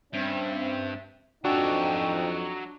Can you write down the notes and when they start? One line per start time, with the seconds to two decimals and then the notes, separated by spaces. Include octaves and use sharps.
0.13 G2 C4 C#4 E5
1.44 F2 F3 F#3 D4 D#4 F#4 E5 G5